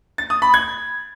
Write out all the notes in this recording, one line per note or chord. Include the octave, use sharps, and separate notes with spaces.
A6
D#6
B5
G#6